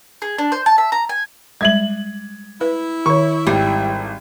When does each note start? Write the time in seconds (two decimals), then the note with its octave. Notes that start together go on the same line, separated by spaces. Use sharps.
0.22 G#4
0.38 D4
0.52 C5
0.66 A5
0.78 E5
0.92 A#5
1.09 G#5
1.61 G3 G#3 E5 G#6 F#7
2.61 E4 B4
3.06 D#3 C#5 C#6
3.47 G#1 G3